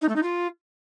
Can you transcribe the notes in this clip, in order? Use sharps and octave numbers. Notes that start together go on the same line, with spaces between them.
D#4
A3
D#4
F4